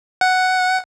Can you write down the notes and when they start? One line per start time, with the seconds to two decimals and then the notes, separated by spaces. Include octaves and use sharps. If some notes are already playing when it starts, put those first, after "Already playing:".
0.21 F#5